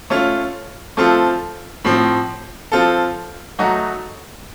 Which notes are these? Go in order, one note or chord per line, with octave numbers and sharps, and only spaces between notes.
A3 C#4 F4
F3 A3 C4 F4 A4
A2 F3 C4
F3 C4 F4 A4
F#3 A3 D#4 F#4